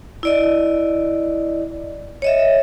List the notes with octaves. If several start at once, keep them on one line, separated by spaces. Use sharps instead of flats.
E4 D5 D#5
C#5 D#5 E5